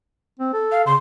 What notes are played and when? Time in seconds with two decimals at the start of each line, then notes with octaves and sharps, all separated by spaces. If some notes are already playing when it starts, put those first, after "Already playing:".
0.40 C4
0.54 A4
0.72 F5
0.86 C#3 C6